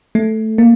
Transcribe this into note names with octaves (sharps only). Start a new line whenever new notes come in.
A3
A#3